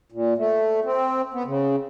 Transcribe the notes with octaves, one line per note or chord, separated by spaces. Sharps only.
A#2
A3
C4
B3
C#3